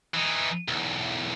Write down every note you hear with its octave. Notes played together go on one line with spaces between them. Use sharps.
E3 D#4
B1 E2